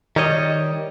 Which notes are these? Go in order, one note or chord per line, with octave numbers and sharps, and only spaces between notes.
D#3 G3 C#5 D#5